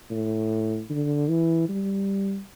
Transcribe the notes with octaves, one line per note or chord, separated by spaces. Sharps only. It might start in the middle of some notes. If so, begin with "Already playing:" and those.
A2
D3
E3
G3